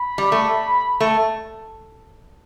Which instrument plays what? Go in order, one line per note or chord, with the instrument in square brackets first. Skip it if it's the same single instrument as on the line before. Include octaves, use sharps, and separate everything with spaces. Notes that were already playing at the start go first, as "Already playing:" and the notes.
Already playing: [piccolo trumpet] B5
[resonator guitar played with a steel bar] G3
A3
A3